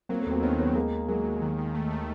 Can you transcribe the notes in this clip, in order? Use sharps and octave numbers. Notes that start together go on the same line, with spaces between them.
F#3 A#3 C4
A3 B3
D#2
A#3 C4
D#3 B3 C#4
D#2 B3 C#4
D#2 G#3 A#3
D#2
F#3 G#3 A#3
D#2
D#3
D#3
A3
A3